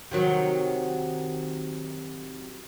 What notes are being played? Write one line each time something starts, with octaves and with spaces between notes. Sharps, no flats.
C3 D#3 F#3